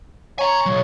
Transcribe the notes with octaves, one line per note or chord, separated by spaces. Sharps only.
C#5 G#5 A#5
B1 F#3